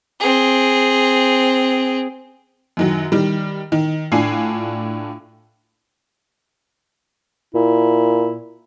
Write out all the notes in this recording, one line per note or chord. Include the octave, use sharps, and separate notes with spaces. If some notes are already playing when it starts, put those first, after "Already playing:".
C4 G#4
F#2 D#3 F#3
D#3 G3
D#3
A2 D4 F4 G#5 C7
A#2 E4